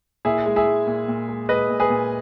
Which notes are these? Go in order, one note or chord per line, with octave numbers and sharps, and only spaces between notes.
A#2 E4 G#4
G#3
E4 G#4
G#3
A#2
A#2
G#3
G#3 B4 D#5
A#2
G#4 B4
A#2